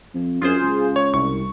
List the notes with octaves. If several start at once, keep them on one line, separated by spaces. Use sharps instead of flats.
F2
F#2 F4 G#4 C5
C#2
C#5
C2 C#6